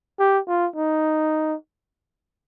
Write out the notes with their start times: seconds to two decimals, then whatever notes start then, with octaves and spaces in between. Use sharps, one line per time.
0.19 G4
0.48 F4
0.76 D#4